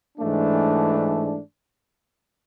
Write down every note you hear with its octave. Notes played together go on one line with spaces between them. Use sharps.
G#2 E3 A3 D4